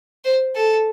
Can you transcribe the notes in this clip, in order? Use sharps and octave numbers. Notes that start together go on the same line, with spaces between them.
C5
A4